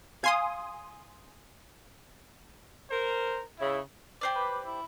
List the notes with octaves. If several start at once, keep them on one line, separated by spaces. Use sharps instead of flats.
F5 G#5 C6 D#6
A#4 C5
C#3 E4
G4 C5 D5
B4
E4